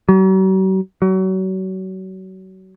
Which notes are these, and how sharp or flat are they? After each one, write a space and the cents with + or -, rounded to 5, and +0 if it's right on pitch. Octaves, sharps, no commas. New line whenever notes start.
F#3 +45
F#3 +30